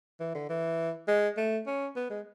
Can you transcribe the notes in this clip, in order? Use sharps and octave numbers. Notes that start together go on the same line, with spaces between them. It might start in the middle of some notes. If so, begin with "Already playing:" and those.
E3
D3
E3
G#3
A3
C#4
B3
G#3